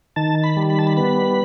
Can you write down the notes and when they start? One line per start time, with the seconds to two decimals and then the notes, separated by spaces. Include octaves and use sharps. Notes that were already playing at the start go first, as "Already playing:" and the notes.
0.16 D#3 A5
0.44 B5
0.57 G3
0.70 B5
0.79 A5
0.87 B5
0.97 B3 B5